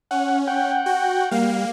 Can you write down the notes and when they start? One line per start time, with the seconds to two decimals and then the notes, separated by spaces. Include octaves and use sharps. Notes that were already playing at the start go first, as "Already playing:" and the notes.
0.11 C#4 F#5
0.47 F#5 G5
0.86 F#4
1.31 G3 A#3 F5